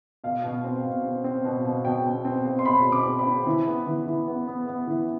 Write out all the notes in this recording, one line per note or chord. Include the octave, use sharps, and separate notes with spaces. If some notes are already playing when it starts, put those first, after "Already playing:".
B2 F5
B2
C4
B2
C4
C4
B2
B2
B2 G5
B2
C4
C4
C6
B2 B5
B2
D6
C4
B5
C4
E3
B3
E3
E3
B3
B3
B3
E3